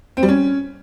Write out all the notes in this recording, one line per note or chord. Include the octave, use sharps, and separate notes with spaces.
C4
G3
C#4